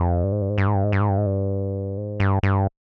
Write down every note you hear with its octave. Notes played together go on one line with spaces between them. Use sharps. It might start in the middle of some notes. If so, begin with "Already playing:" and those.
Already playing: F2
G2
G#2
G2
G#2
G2
G#2
G2
G#2
G2
G#2
G2
G#2
G2
G#2
G2
G2